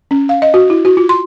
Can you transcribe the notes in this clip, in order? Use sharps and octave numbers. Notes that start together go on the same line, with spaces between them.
C#4
F5
D#5
F#4
E4
F#4
F4
C6